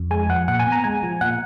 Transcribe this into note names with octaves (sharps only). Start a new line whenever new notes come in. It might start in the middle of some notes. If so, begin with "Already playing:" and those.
Already playing: F2
G#3 G#5
F3 F#5
A#2 F#5
G#5
B3
A#5
G#3 G#5
F3
A#2 F#5